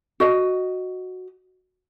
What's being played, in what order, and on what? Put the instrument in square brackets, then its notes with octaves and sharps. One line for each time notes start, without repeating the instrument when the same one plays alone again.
[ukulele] F#4 D#5